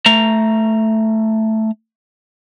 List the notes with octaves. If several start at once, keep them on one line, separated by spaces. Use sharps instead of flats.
A3 A#5